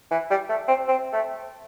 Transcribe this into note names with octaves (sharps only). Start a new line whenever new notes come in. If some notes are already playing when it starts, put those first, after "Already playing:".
E3
G3
A3
C4
C4
A3